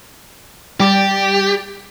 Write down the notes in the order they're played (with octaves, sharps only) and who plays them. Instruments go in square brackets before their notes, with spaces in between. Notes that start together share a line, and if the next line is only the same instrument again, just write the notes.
[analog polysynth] G3 D6 A6 [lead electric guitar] G4